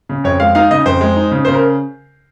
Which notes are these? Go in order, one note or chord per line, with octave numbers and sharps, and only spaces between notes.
C#3
F2 C#5
G#3 F5
D#4 F5
C#3 D#5
F2 C5
G#3
D#4
C#3
C#3 C5
A#4